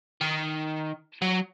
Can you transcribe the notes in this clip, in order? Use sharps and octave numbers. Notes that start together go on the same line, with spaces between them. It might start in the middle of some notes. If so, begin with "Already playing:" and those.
D#3
F#3